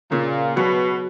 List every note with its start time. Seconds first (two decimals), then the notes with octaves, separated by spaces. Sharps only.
0.11 A#2 C#3
0.56 B2 F#3